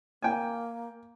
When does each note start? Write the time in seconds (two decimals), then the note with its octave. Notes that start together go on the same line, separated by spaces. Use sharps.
0.22 A#3 G5 G#5